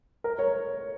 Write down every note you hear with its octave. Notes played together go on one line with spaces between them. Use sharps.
A#4
C#5